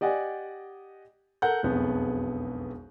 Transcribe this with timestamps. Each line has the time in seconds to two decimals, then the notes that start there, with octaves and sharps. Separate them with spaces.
0.01 G4 D5 D#5 F#5 G#5
1.42 A4 A#4 F#5 F#6 G6
1.63 E1 B1 F2 B3 G#4